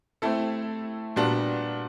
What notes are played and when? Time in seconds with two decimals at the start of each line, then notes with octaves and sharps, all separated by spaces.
0.22 A3 C4 E4 A4
1.16 A#2 G3 B3 D4 F#4